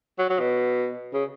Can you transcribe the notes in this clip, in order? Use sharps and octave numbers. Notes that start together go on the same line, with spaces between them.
F#3
F#3
B2
C#3